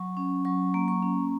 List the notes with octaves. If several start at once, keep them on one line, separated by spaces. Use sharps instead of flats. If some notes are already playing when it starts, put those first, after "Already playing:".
Already playing: F#3 C#6
C#4
F#3 C#6
A#3
C#6
C#4